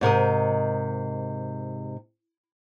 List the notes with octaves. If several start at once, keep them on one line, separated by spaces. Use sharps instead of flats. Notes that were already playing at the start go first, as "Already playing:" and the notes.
G#2 C3 A#4 D#5